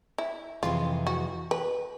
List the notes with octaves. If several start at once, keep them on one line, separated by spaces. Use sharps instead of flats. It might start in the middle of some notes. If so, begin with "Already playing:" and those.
E4
F2 C3 E3 G#3 F4
F#4
B4